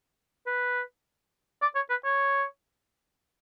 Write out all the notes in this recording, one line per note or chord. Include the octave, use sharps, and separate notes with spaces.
B4
D5
C#5
B4
C#5